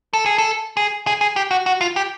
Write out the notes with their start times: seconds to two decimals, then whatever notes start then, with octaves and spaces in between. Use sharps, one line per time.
0.13 A4
0.26 G#4
0.38 A4
0.77 G#4
1.07 G#4
1.21 G#4
1.36 G4
1.51 F#4
1.66 F#4
1.81 F4
1.96 G4